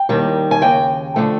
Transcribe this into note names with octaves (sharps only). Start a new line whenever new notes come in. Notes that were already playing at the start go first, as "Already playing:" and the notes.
Already playing: G5
D#2 D#3 G3
G#5
D#2 C#3 G5
D3 F3 A3